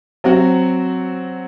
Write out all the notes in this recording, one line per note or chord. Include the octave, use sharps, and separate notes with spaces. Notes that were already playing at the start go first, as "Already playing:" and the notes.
F#3 C4 F#4